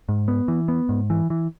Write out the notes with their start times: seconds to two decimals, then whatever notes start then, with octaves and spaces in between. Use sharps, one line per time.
0.09 G#2
0.28 B3
0.48 E3
0.68 B3
0.89 G#2
1.10 E3
1.30 E3